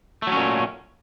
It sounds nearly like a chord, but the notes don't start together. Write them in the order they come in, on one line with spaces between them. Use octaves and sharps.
A3 F#3 C#4 A#2